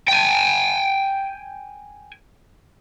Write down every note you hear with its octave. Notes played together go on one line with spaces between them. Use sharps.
G5 G#5